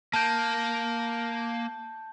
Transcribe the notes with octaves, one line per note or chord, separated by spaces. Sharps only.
A#3 A5 G6